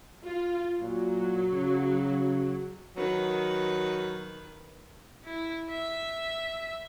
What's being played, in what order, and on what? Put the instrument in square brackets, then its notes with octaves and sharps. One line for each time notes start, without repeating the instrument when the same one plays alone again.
[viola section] F4
[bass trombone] A#2 [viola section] F#3
[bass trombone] C#3
[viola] D#3 B4 [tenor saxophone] F#3
[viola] E4
E5